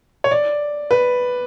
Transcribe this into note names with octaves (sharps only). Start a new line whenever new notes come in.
C#5
D5
B4